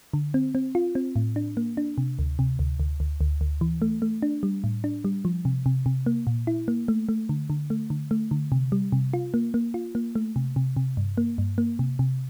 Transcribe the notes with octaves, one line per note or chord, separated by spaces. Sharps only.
D3
C4
C4
F4
C4
A2
D4
A#3
D4
C3
D2
C3
D2
D2
D2
D2
D2
E3
A3
A3
D4
G3
A2
D4
G3
F3
C3
C3
C3
A#3
A#2
E4
A#3
A3
A3
D3
D3
A3
D3
A3
D3
C3
G3
C3
F4
A#3
A#3
F4
A#3
A3
C3
C3
C3
G2
A#3
G2
A#3
C3
C3